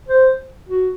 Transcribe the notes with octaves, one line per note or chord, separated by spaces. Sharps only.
C5
F#4